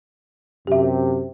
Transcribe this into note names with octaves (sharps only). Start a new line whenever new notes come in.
F#2 C3 G4 E5